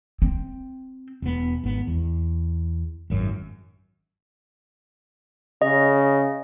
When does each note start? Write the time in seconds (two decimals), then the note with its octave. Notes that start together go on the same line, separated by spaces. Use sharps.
0.22 C4
1.22 E1 B3
1.63 G#1 B3
1.87 E2
3.10 G#1 F#2
5.62 C#3 D#5